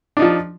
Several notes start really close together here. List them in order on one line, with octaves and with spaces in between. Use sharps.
D4 D#4 F3